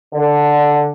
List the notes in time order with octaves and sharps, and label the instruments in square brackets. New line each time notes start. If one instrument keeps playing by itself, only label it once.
[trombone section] D3